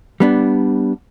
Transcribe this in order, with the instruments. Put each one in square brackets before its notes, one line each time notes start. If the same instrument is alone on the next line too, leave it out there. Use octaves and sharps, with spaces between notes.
[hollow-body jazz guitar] G3 B3 D4